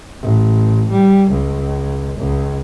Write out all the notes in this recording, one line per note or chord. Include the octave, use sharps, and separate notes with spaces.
A1
G3
C#2
C#2